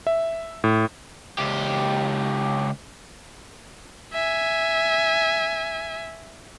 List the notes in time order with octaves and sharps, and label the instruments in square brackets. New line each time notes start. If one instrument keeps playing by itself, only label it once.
[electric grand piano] E5
A2
[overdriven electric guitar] C#2 G4
[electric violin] E5 G#5